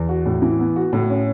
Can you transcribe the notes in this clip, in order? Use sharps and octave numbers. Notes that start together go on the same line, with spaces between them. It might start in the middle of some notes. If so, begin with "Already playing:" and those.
Already playing: E2
F#4
A2
E3
B3
F#4
A2
C#4